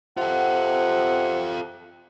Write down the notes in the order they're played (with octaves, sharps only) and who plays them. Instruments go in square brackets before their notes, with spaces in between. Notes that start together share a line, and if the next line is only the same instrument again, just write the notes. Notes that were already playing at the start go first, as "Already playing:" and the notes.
[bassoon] C3 [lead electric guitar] F4 A4 [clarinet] F#5